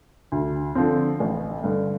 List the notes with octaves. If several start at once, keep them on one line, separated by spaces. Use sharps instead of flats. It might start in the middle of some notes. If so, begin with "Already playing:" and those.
D2
D3 F3 C4
A1
G2 D3